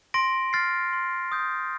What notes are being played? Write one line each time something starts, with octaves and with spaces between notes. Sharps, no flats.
C6 A#6 D7
F6 A6 C7
C6
D#6 G6